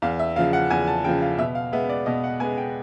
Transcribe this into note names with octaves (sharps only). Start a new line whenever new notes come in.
E2 F5
E5
C#3 F3 F5
F#5
E2 G#5
A5
C#3 F3 G5
F5
B2 E5
F5
G#3 B3 E5
D5
B2 D#5
F#5
G#3 B3 G#5
G5